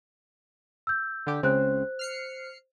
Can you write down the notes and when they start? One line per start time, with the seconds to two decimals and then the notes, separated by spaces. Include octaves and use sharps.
0.87 E6 G6
1.27 D3 G4
1.43 C#2 C#3 C4 C5 F#6
1.99 F6 C7 C#7